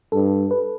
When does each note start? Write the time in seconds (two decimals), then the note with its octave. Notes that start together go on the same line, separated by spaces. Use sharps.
0.12 G2 A4
0.51 B4